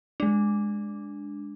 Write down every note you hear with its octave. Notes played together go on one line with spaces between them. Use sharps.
G#3 D4